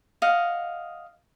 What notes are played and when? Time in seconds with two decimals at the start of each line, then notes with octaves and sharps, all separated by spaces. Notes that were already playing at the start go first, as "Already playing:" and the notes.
0.22 D#5 F5 F#5